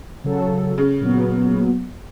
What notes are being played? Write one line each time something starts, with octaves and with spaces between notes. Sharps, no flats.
C#3 F#3 A4
C#3
A#2 F#3 B3